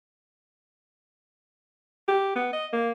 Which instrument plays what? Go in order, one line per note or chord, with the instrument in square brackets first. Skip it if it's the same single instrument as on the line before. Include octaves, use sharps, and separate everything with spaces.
[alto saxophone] G4
B3
D#5
A#3